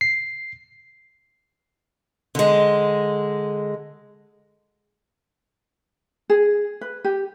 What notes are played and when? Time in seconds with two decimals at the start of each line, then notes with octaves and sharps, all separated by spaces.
0.01 C7
2.35 D3 G#3
6.30 G#4
6.81 B4
7.05 G4